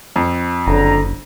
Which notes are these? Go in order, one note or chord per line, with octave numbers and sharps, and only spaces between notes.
F2
F#1 D3 A#5